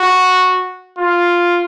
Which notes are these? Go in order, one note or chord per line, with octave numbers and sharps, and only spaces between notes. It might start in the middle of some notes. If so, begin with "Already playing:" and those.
Already playing: F#4
F4